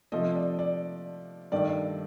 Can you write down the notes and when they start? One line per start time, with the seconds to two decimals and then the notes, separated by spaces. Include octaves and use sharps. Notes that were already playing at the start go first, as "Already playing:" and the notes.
0.12 C3 F3 A3 D#5
0.35 D5
0.59 D5
1.52 G2 D#3 A3 D5